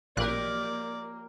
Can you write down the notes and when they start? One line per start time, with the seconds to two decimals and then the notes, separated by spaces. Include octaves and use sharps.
0.17 A1 A#2 F3 A#3 G4 A#4 D5 F#6